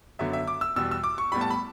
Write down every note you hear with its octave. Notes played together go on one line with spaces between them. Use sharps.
F#2 D3 F#3 B3 E5
E5
D6
E6
E2 B2 G3 B3 E6
E6
D6
C#6
A2 G3 B3 B5
A5
B5